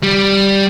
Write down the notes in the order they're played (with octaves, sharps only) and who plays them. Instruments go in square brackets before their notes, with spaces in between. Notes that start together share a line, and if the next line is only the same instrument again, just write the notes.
[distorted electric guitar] G3